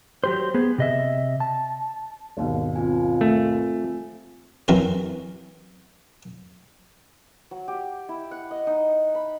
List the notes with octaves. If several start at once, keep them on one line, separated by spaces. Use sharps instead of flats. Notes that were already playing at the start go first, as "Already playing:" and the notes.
F#3 G4 C5
B3 G#4
C3 D#5 E5
A5
G#1 D#2 B2
C4 F4 G#5
A3
F#2 E3 C4 A#4 C5
F#3
G4
E4
F#5
D#5
D#4
B5